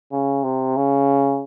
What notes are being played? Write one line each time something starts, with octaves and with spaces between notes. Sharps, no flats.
C#3
C3
C#3